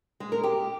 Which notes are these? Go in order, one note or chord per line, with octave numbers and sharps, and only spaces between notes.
G#3
A#4
G4